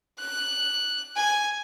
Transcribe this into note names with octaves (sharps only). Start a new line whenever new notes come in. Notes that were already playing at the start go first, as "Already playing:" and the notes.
F#6
G#5